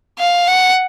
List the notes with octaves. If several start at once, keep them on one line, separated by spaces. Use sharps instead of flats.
F5
F#5